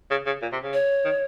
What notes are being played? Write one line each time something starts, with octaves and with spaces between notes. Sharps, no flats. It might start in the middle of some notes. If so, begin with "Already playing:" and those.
C#3
C#3
A#2
C3
C#3
C#5
D#3